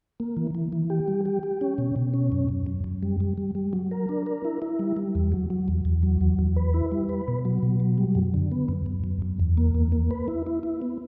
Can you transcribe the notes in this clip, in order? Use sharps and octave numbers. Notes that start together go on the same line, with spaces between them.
A#3
E3
E3
E3
G4
G3
G4
G4
C#4
B2
B2
C#4
F#2
F#2
F#2
F#2
G3
G3
G3
G3
F#3
A#4
D4
A#4
E4
E4
G3
G3
E2
F#3
F#3
E2
E2
F#3
E2
E2
B4
E4
G3
B4
B2
F#3
B2
F#3
G3
F#2
D3
B3
F#2
F#2
F#2
F#2
E2
A#3
E2
A#3
B4
E4
E4
E4
B3